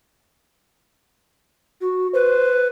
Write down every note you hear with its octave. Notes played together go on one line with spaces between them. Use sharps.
F#4
B4 C5